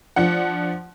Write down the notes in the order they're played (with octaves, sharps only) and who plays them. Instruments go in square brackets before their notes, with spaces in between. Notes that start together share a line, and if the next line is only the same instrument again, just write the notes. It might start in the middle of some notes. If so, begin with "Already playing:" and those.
[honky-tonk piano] F3 D4 F#5